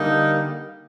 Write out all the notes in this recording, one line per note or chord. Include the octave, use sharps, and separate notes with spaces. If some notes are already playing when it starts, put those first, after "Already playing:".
Already playing: D3 G3 A#3 D#4